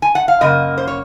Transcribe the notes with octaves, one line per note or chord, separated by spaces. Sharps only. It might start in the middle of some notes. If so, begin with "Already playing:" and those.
G#5
F#5
F5
F#2 C#3 A#3 D#5
C5
C#5